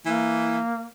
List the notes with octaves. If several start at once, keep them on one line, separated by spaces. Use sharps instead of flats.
E3 A#3